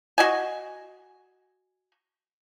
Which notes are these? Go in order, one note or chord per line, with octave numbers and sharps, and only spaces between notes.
F#4 D#5 G#5